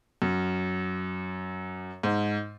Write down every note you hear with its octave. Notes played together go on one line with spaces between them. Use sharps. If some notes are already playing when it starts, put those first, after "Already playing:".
F#2
G#2